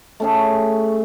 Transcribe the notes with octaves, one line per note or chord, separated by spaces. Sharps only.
A3 C#4 G#4